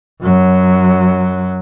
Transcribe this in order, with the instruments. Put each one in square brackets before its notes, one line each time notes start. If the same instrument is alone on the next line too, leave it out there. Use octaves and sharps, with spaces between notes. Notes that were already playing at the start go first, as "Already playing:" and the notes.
[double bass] F#2 F#3